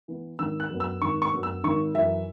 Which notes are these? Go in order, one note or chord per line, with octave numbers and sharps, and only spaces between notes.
E3 B3
G#1 E6
F#6
F#2 F#3 B3
E6
G#1 C#6
C#6
F#2 F#3 B3
E6
G#1 C#6
F#2 E3 E5